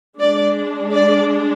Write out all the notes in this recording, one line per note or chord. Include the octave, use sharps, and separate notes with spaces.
G#3 D4 D5
D5